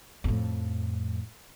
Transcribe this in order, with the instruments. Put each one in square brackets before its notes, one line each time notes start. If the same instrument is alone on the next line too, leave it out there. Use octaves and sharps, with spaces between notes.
[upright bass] F2 A2